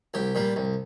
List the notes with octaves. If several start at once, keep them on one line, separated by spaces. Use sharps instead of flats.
C2 G4
A#2 G3
C2